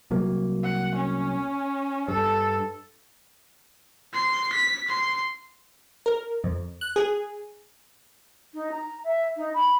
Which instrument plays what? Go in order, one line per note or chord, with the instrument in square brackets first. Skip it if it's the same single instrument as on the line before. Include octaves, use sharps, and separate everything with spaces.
[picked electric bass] C2 F#3 A#3
[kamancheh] F#5
C#4
[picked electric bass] G2 [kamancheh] A4
[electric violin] C6
B6
C6
[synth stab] A#4
F2
F#6
G#4
[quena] D#4
A#5
E5
D#4
B5